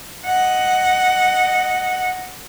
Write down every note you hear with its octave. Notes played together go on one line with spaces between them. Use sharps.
D#5 F#5